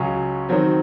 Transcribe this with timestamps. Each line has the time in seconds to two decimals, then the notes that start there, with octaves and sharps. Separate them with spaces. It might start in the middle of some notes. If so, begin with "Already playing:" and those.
Already playing: C#2 C#3 F#3 C#4
0.49 D#3 F#3 C4